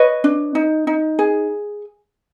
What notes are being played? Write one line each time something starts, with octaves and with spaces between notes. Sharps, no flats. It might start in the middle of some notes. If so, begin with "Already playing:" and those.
Already playing: B4 C#5 D#5
D4
D#4
D#4
G#4